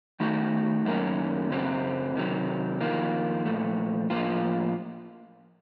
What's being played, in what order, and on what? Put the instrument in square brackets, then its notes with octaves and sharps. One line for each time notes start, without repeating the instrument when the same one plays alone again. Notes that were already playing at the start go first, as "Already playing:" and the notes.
[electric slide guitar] D#3 A3 D#4 F#4
F#2 D#3 A#3 C#4
F#2 C#3 F#3 C4
C3 D#3 F#3
F2 D#3 A#3 F4
A#2 F3 A3
A2 F3 A#3 F4